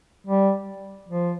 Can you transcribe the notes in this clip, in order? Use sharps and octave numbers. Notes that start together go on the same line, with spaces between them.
G3
F3